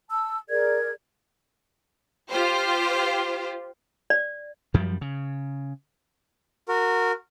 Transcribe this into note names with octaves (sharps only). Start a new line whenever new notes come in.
A5 E6
G#4 A#4 D5 G#6
F4 G4 C5
D5
F#2 F3 G3
C#3
F#4 A#4